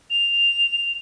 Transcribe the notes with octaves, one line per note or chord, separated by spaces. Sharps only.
F7